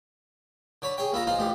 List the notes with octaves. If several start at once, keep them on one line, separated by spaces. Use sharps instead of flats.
D3 C#5 B5
G#4 C#5 G5
D#2 E4 F4 A#5
E3 D#4 F4 C5
A1 D2 F4 G4